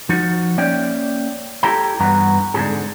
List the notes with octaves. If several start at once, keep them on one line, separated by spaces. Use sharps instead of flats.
F3 D#4 F#4
A#3 C#4 D5 E5 G5
E4 G4 A4 G5 A#5
G2 E3 B3 F#4 A#5
G#2 D3 F3 C4 G4 G#4